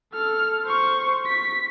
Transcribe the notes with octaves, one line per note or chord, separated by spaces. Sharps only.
A4 F6
C5 C#6
B6